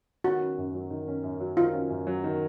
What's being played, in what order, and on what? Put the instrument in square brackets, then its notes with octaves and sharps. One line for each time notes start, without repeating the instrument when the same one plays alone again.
[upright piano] D#3 [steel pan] F#4
[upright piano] C#4
F#2
F#3
D#3
C#4
F#2
F#3
[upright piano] D#3 [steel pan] F4
[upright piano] C#4
F#2
F#3
D#3